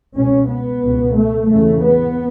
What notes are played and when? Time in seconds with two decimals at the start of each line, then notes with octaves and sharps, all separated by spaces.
0.16 C#2 B2 C#4
0.49 B3
0.83 C#2 B2
1.16 A3
1.50 E2 C#3 A3
1.84 B3